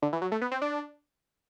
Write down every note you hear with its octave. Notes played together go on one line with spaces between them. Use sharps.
D3
E3
F#3
A3
B3
C4
D4